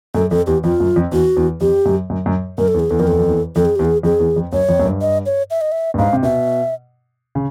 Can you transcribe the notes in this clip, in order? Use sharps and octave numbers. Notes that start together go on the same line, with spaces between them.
F#2 A4
F2 A4
E2 G4
F2 F4
F#2
F2
E2 F#4
E2
F2 G4
F#2
F#2
F#2
F#2 A#4
A4
E2
G#4
E2 A4
F2 A#4
E2 A4
F2
E2
F2 A4
G#4
E2 G4
G#4
F2 G#4
E2
F2
F#2 C#5
F2
F#2
G2
D#5
C#5
E5
D#5
E5
G2
G#2 F5
C3
B2 E5
C#3